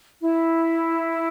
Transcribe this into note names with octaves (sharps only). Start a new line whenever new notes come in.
E4